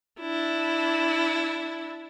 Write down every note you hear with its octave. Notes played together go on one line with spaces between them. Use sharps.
D4 E4